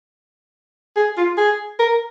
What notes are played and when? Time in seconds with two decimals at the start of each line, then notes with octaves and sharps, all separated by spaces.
0.97 G#4
1.17 F4
1.38 G#4
1.79 A#4